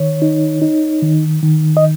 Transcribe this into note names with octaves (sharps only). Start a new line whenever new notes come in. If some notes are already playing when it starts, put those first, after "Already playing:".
Already playing: D#3 C#5
D#4
D#4
D#3
D#3
D#5